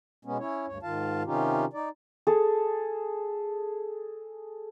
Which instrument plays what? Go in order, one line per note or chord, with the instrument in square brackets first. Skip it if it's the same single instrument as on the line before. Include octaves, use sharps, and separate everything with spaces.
[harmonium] B2 G#3 B3 C#4
C#4 E4 C#5
D2 G2 C#5
G#2 D#3 F4 F5 A5
C3 D#3 C#4 D#4 F4 G4
D#4 D5
[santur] G#4 A4